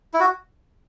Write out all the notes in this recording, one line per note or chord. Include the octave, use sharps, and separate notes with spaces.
E4
F#4